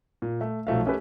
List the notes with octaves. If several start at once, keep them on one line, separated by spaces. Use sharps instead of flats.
A#2
A3
B1 F3 A3 F5
A3 C#4 G4 A4 B4